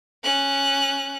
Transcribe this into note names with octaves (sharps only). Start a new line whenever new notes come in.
C#4 F#6